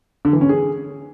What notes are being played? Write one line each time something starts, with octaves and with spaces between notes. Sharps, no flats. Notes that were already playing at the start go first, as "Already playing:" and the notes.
D3
E3
C#4
G#4